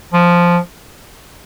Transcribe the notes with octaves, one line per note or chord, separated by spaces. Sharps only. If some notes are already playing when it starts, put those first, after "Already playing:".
F3